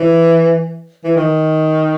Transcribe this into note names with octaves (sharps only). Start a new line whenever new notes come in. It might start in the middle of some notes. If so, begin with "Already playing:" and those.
Already playing: E3
E3
D#3